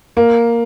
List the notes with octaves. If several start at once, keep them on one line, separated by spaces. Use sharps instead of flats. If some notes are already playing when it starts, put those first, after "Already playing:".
A#3